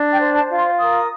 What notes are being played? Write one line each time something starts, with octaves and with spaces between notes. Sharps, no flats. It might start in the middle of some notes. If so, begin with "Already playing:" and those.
Already playing: D4
G5
C5
A5
F4
C6
A#4 D#6